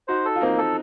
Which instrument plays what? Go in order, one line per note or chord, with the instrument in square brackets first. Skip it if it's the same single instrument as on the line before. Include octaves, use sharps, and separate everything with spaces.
[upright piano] D#4 F#4 [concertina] C5
[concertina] A4
[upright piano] F4
[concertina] A#3 [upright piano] C4 D#4
[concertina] A4